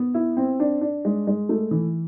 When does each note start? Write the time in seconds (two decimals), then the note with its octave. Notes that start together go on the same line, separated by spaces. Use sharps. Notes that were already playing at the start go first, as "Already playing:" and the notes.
Already playing: B3
0.14 E4
0.37 C4
0.60 D4
0.81 D4
1.05 G#3
1.27 G#3
1.49 A3
1.71 E3